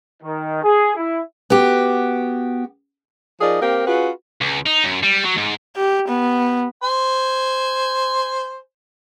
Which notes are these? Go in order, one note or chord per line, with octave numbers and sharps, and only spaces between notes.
D#3
G#4
E4
B3 F#4 G4
F3 D#4 G#4 A#4 D5
A#3 C4 G4 A#4
C#4 F4 F#4 G#4 B4
C#2
D#4
F#2
G3
F#3
G#2
G4
B3
C5 G#5